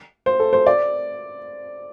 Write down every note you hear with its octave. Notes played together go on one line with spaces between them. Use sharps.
C5
A4
C5
D5